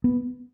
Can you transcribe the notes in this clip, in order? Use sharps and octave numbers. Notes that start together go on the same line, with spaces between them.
B3